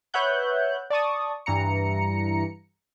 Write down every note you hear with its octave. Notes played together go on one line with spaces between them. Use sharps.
B4 C#5 E5 F#5 F#6 G6
D5 A5 C#6 D#6
G2 E3 A#5 C#7